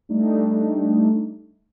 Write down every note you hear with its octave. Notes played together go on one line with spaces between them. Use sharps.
G3 A3 D4 D#4